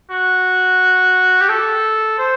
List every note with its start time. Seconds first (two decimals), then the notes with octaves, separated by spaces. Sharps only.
0.10 F#4
1.41 G4
1.49 A4
2.19 C5